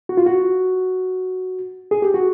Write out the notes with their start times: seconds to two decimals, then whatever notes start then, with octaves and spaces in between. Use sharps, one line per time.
0.09 F#4
0.17 F4
0.26 F#4
1.91 G#4
2.02 G4
2.14 F#4